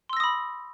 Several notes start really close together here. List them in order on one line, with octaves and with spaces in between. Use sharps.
C6 E6 A#6 D#6 B5